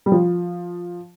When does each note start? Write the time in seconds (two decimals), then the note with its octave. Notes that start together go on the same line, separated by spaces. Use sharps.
0.06 G3
0.12 F3